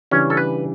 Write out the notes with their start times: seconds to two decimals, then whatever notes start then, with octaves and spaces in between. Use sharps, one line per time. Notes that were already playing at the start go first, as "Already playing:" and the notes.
0.11 C#3 E3 G3 C#4 D4
0.30 A4
0.37 B4